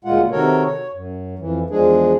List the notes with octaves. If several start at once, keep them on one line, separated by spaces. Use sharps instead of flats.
D2 A#2 G#3 F4 F#5
C3 D#3 F#4 A4 A#4 C#5
C#5
F#2
F2 E3
E2 F3 G#3 D4 G#4